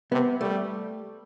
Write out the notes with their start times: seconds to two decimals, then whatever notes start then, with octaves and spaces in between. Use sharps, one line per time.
0.12 C3 B3
0.41 G3 A3